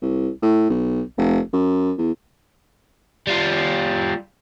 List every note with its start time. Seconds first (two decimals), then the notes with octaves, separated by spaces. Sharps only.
0.02 C2
0.42 A2
0.70 B1
1.18 F1
1.53 F#2
1.98 E2
3.27 G3 F4